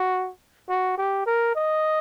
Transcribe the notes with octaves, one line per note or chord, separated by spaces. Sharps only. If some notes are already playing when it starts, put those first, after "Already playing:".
Already playing: F#4
F#4
G4
A#4
D#5